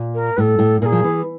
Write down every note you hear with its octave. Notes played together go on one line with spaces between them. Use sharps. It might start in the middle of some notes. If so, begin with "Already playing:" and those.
Already playing: A#2
A#4
A2 A4 B4
A2
A#2 G#4 A#4
F3
E3